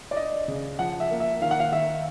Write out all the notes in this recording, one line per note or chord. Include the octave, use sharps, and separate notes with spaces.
D5
D4 D#5
C#3
F3 F#5
E5
A#3
E5
D#3 F5
F#5
F5
D#3 E5